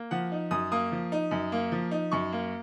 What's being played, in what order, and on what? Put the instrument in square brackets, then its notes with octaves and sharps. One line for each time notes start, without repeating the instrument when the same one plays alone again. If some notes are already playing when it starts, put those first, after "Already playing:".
Already playing: [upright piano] A#3
F3 F#5
D#4
F#2 D#6
A#3 D#6
F3
D#4
F#2
A#3
F3
D#4
F#2 C#6
A#3